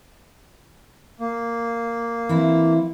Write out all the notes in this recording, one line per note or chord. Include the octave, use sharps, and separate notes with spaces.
A#3
E3 C4 E4